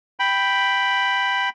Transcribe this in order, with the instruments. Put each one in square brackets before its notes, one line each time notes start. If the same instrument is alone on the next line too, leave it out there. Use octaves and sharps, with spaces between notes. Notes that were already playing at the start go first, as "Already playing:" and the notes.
[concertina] G5 B5